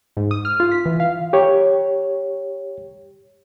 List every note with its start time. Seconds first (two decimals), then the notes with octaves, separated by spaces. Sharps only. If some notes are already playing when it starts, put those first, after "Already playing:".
0.17 G#2
0.31 D#6
0.45 F6
0.60 F4
0.72 B6
0.86 E3
1.00 F5
1.33 G4 C#5